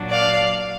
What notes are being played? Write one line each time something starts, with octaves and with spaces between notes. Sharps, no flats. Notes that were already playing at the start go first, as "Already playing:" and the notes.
Already playing: A#2 F#3 A#3 D4
D5 F5